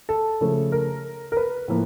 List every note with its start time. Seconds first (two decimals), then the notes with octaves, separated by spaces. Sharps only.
0.09 A4
0.41 C#3 F3 A3
0.72 A#4
1.32 A#4
1.37 B4
1.68 A2 F3 A#3